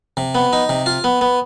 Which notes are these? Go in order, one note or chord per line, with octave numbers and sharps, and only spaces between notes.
C3
B3
D#4
C3
F4
B3
B3